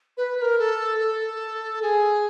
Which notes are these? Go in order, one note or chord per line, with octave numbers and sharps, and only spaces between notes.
B4
B4
A#4
A4
A4
G#4